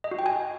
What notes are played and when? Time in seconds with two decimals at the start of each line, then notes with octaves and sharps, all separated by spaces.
0.04 D#5
0.11 F#4
0.19 G5
0.26 G#5